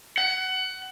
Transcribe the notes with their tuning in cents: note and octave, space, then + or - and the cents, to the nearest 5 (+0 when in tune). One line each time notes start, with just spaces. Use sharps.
F#5 +20